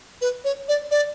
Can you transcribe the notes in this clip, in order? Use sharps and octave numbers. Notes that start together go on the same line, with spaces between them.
B4
C#5
D5
D5